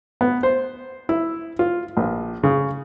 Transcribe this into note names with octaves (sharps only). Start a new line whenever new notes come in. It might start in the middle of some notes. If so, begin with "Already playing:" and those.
B3
C5
E4
F4
A#1
C#3